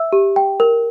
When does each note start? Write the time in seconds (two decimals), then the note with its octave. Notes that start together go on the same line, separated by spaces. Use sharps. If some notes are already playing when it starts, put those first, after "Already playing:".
Already playing: E5 E6
0.13 G4
0.36 G5
0.60 A#4